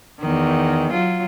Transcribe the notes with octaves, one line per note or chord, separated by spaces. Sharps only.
E2 D#3
F#3 F4